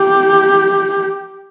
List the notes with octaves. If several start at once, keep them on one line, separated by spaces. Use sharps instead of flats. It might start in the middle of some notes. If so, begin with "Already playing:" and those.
Already playing: G4